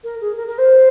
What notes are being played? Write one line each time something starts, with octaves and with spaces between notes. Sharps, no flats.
A#4
G#4
A#4
A#4
C5